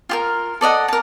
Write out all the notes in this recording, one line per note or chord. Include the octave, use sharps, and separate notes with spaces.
F4 G4 A#4
A4 D5 D#5 F#5
A#4 A5